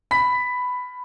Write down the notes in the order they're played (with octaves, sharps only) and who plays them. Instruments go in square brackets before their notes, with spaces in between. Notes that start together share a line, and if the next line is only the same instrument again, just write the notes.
[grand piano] B5 B6